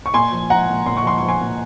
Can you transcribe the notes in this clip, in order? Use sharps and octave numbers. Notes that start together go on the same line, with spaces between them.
C#6
A#2 G#5 C6
F3
F3 F#5 A#5
A#2
A#2 C6
C#6
F3 C6
F3 C#6
G#5 C6
A#2